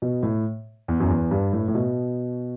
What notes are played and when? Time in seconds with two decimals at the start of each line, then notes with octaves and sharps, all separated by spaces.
0.02 B2
0.23 A2
0.88 E2
1.00 F#2
1.10 E2
1.31 G2
1.53 A2
1.68 A2
1.74 B2